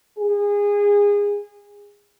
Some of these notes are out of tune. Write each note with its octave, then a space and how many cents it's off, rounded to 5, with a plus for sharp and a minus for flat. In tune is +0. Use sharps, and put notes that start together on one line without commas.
G#4 -25